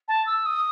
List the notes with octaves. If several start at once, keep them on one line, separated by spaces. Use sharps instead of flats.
A5
E6
D#6